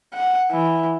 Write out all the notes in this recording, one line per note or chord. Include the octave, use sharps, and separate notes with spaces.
F#5
E3